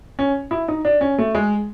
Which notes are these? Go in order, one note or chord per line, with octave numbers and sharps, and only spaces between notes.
C#4
E4
D#4
D4
C#4
A3
G#3